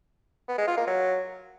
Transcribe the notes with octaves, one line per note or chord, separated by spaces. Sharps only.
B3
G#3
F4
A#3
F#3